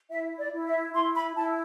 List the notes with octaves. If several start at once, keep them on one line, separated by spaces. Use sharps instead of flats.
E4 E5
D5
E4
E5
E4 C6
B5
E4 A5